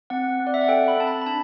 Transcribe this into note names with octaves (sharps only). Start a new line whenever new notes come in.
C4 F#5
C4
D5
E5
F#5
A4 G5
B5
C4 A5
B5
B5
D4 A5